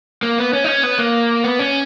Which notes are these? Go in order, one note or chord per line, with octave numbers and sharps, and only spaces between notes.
A#3
B3
C#4
D#4
C#4
B3
A#3
B3
C#4